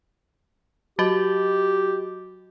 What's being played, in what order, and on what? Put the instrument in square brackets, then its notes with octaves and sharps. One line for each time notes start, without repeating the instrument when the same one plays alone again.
[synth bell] F#3 F#4 D#5 [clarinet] G4